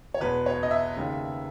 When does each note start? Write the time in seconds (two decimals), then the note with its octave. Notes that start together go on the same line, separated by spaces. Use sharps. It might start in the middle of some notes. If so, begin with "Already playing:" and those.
0.14 C#5
0.20 E2 B2 G#3 B3 B4
0.46 C#5
0.63 D#5
0.71 E5
0.96 D#2 C#3 G#3